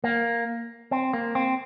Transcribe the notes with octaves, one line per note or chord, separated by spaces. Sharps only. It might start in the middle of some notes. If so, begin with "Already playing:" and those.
A#3
C4
A#3
C4